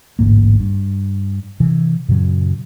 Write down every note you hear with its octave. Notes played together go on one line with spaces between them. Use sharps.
A1 D2 G#2 A#3
G2
C3 E3
F#2 A#2 C#3 F#3